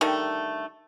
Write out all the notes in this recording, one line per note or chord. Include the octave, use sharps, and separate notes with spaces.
D3 D#3 G3 A3